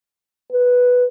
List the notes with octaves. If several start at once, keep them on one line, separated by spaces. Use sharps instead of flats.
B4